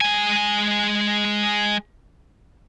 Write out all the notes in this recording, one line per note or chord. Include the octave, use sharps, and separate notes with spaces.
G#3 G#5